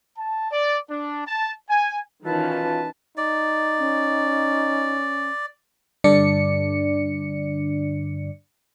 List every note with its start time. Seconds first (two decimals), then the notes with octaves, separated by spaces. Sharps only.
0.17 A5
0.50 D5
0.89 D4
1.25 A5
1.69 G#5
2.26 B2 D#3 E3 C#4 F4 B4 A5
3.17 D#4 D5
3.79 C#4
6.04 G2 D3 D4 D5 C#7